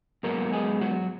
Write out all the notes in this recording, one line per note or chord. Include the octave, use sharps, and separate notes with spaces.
G#2 F#3 A#3 B3 A#4
G#3 G#4
F#3 F#4